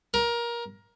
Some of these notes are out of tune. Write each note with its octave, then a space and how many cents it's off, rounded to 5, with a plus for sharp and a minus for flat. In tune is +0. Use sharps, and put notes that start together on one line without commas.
A#4 +20